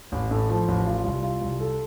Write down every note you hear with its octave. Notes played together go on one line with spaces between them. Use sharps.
A1
A2
F3
A1
F4
C2
F4
C2
A4